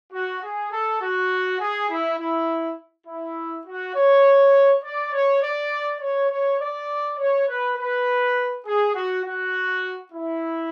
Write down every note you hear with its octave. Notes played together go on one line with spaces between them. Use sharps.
F#4
G#4
A4
F#4
G#4
E4
E4
E4
F#4
C#5
D5
C#5
D5
C#5
C#5
D5
C#5
B4
B4
G#4
F#4
F#4
E4